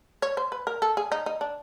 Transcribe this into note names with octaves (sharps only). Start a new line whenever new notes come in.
C#5
C5
B4
A#4
A4
G#4
D#4
D#4
D4